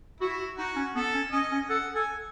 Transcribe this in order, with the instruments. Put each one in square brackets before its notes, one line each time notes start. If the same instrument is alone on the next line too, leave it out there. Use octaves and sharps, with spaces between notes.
[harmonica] E4 [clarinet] F#4
[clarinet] F#4
[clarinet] D#4 [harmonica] F#4
[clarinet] C#4
[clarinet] B3 [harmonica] A4
[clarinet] C#4
[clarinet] C#4 [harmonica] D#5
[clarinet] C#4
[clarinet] A4 [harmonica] F#5
[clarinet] A4 [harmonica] G#5